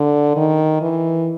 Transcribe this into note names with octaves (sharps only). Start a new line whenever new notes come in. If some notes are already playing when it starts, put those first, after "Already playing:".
Already playing: D3
D#3
E3